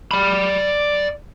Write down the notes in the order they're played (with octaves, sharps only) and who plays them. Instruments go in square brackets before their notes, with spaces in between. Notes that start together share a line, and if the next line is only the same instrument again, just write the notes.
[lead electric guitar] D5 B5